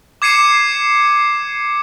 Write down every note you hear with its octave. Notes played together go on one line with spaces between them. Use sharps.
D6 G#6 C7 C#7 D#7 E7